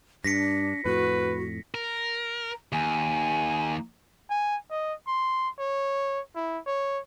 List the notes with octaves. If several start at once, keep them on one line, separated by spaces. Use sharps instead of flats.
G2 D4 A#6 B6 C#7
F2 A2 F#4 B4
A#4
D#2 G#5
G#5
D#5
C6
C#5
E4
C#5